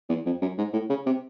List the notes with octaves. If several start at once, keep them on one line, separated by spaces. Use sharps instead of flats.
E2
F2
F#2
G#2
A2
C#3
C3